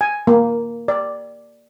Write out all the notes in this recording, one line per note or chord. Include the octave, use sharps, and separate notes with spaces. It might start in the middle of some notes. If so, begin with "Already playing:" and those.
G#5
A#3
D5